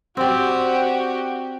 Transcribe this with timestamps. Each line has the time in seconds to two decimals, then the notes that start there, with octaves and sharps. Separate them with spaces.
0.17 C4 F#4 G4 D5